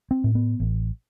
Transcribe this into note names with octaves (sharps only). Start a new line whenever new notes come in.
C4
A2
B3
A1